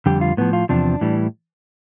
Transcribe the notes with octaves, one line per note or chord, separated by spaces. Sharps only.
F2 D3 G3 G4
F4
A2 F3 B3
F4
E2 C3 F3 D4
A2 E3 G3